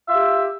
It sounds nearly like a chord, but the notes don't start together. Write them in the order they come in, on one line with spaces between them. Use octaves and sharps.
F4 E5 G4